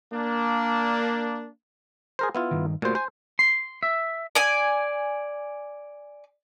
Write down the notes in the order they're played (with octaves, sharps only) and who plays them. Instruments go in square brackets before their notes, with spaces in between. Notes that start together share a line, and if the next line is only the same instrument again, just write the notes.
[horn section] A#3 D4
[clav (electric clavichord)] G#4 A#4 C5
B3 E4 F4
[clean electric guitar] G2 D#3
[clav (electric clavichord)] A#2 C5 [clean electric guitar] A3 F#4 G4
[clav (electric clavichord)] C5 [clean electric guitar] G#5
[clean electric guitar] C6
E5
[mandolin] D5 G#5